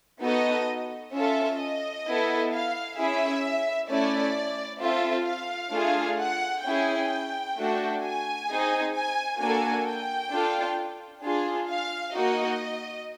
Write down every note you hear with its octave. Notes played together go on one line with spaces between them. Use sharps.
B3 D#4 F#4 A4 D#5
C#4 F4 A4 E5
D#5
B3 E4 A4
F5
C#4 E4 G#4 E5
A3 C#4 E4 D5
C4 F4 A4 E5
F5
A3 D4 F4 G#4
F#5
C#4 E4 G#4 G5
A3 D4 F#4
G#5
C4 D#4 G#4
G#5
A#3 D4 F#4 A4 G#5
G5
D4 F4 A4
D4 F4 G#4
F5
A#3 D#4 F#4 D#5